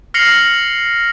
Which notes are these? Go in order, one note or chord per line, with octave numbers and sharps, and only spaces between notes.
F6 A#6 C7 C#7 F7 F#7